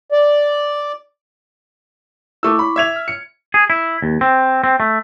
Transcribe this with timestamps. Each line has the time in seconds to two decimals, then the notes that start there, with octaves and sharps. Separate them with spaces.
0.12 D5
2.43 A3 E4 C#6 D6 E6
2.59 B5
2.76 E5 G#6 F7
2.96 F6
3.08 C#7
3.54 G#4
3.70 E4
4.02 D#2
4.21 C4
4.64 C4
4.80 A3